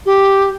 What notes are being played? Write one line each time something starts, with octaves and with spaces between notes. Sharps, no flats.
G4